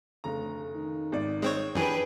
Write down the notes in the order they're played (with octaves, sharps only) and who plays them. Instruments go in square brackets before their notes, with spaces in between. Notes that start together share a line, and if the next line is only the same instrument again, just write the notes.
[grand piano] F1 C#3 A#5 [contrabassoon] D2
[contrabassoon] D#3
[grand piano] G#1 D5
[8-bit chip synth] G#3 C4 C#5
[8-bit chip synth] F#2 E3 [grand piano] D4 G4 [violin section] G#4 B4 G5